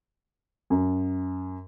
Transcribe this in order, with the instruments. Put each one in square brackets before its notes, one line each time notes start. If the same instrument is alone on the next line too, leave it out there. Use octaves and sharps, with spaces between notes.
[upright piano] F#2